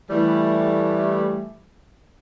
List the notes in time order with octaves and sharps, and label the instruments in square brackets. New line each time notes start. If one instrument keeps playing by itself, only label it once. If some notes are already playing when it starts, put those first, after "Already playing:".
[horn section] E3 G3 A3